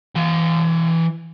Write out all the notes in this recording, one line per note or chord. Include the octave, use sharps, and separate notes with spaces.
E3 F5